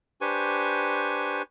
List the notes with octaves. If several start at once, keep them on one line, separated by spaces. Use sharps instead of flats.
D4 G4 B4 C5 G#5 C#6